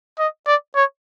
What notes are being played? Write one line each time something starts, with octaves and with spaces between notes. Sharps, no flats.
D#5
D5
C#5